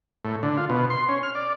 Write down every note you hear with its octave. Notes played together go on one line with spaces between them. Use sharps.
A2
D3
F4
B2
C6
C#4
F6
D5